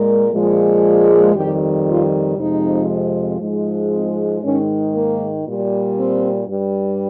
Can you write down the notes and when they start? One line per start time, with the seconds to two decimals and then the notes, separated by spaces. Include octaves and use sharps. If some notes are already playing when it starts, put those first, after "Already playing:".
Already playing: A#2 G#3 A#4
0.32 A#2 F3 G#3
1.34 F2 D#3 G3 G4
1.86 F4
2.37 F2 C3 F3 G#3 D#4
3.40 G#2 F3 G#3
3.91 C4
4.42 G#2 D#3 G#3 C#4
4.94 A#3
5.45 A#2 G3
5.96 C4
6.48 G2 G3